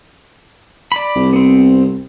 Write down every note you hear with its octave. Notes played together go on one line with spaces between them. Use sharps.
D5 B5
C2
B3 C4